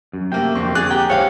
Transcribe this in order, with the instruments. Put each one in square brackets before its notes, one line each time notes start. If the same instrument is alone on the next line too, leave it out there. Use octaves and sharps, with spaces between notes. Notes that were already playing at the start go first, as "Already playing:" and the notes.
[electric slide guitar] F#2
[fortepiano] C3 A3 A#3 [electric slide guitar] G5
[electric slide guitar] F2 C4 [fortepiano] D3 C#6
[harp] G#4 [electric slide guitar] D5 [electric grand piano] F#6
[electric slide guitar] G4 [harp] G5 [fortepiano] A#5
[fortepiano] C#2 G2 [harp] C#5 F5